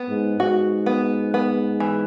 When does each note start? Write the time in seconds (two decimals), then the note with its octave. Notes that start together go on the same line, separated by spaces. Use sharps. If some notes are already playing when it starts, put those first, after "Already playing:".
Already playing: B3
0.09 G#2
0.39 G#2 F#4
0.86 B3
1.34 B3
1.80 E3